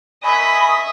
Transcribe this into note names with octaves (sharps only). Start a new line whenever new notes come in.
A#4 D#5 E5 G#5 B5 C#6 D#6